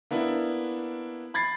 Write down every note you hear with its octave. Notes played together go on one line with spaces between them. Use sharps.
A#3 B3 D4 E4
B5 G#6 A6 C7